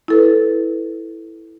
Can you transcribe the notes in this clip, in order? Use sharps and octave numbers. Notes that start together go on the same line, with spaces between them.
E4 A4 B4